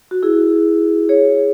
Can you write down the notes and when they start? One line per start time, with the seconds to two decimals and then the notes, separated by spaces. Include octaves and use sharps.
0.11 F#4
0.23 E4 G#4
1.09 G#4 C#5